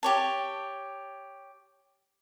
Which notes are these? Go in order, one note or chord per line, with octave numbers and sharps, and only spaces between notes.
G4 C#5 A5